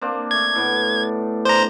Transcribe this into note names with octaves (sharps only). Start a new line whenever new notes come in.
A#3 C4 D4
A3 D5 G#6
A2 B3
D4 C5 A#5